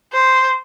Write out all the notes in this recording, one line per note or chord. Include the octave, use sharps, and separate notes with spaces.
C5